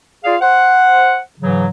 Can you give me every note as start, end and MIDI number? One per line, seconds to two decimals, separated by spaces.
0.24 0.36 65
0.24 0.36 68
0.24 0.36 74
0.24 0.36 77
0.41 1.19 72
0.41 1.19 78
1.40 1.67 44
1.40 1.67 49
1.40 1.67 52
1.40 1.67 54